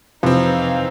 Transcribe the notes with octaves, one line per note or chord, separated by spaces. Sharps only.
F2 C3 E3 F3 C4 D#4 B4 F5